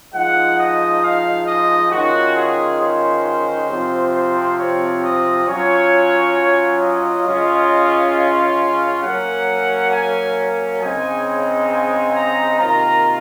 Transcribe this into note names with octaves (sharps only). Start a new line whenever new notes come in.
F3 G#3 D#4 F#5
D#5
F5
D#5
D#3 G#3 C#4 F4 F#4
G#4
C5
C3 F3 C4
C5
C#5
D#5
F#3 C#4 F4 C#5
D#5
C#3 G#3 C#4 F4
F5
F#3 A#3 C#4 F#5
G#5
C#3 G#3 C4 D#4 G#5
G#5
A#5
C3 D#3 A#3 F4 A#5